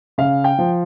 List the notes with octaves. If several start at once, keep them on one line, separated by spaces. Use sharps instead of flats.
C#3 F5
G5
F3